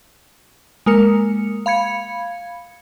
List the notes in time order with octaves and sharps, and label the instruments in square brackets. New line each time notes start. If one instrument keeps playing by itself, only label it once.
[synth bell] G#3 A#3 A#4 C#7
F5 B5 G#6 C#7